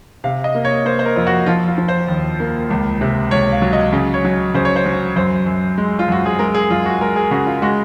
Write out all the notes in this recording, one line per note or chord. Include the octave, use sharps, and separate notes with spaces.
C3 F5
D#5
A#3
C#5
A#3 C5
C5
A#4
F2 F4
F#4
F3 F4
F4
F3
C5
D#2
A#3
C#2
C3
C#2 C#5
F5
F#3
D#5
C#3
C#5
F#3
C#3 C5
C#5
C5
F#3
F#2 C5
F#2
G#3
F4
F#2 F#4
G#4
G#3 A#4
G#4
F#2 F4
F#4
G#3 A#4
G#4
C#3 F#4
F4
G#3 F#4